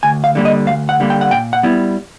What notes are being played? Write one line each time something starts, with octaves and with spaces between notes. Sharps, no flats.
D2 G#5
F5
D3 G3 A#3
D#5
D2 F5
F#5
D3 G3 A#3
G5
F#5
A#2 G5
F#5
G3 B3 E4